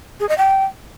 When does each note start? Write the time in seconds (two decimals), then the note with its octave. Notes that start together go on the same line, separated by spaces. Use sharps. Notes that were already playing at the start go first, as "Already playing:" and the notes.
0.20 G#4
0.29 D#5
0.38 G5